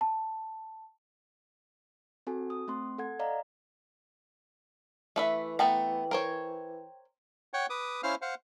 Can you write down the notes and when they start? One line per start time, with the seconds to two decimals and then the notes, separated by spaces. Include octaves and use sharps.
0.01 A5
2.27 C4 F#4 A4 G#5
2.50 D#6
2.68 A3 C4 C6
2.98 A4 F#5 G#6
3.19 D5 D#5 F5 A#5
5.16 E3 A3 B4 E5
5.59 A3 B3 G5 A#5
6.11 A#4 C5 C#5
7.54 C#5 F#5 G5
7.70 B4 D6 D#6
8.03 C#4 E4 C5 F5 F6
8.22 C5 F5 F#5